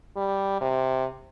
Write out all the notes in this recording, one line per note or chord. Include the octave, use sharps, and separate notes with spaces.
G3
C3